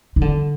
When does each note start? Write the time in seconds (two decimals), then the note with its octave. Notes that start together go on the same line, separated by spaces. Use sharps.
0.16 D#3
0.21 D3